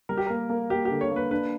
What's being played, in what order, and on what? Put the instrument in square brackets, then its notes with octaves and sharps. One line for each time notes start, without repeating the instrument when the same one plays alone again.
[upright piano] G3 [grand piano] A#4
[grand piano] G4
[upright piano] A#3 [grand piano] A#4
[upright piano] A#3
[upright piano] A#3 [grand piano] G4
[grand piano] G4
[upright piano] D3
[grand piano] C#5
[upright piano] A#3
[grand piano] B4
[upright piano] D4 [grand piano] B4